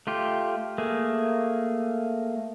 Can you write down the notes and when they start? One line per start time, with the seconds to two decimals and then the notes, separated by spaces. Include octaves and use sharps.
0.07 A3 F4 G4
0.78 A3 A#3 G#4